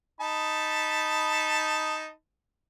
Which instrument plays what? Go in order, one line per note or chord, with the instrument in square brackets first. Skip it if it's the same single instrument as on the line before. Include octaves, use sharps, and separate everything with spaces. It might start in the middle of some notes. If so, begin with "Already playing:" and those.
[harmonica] D#4 A5 B5